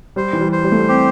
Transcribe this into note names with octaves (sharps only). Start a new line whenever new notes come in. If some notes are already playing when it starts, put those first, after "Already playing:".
G3 C5
E3
G3
C5
G3
A3
G3
C4 G4